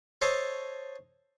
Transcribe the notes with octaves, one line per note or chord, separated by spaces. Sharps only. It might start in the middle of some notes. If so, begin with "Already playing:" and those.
A4 C5 C#5 D#5 A5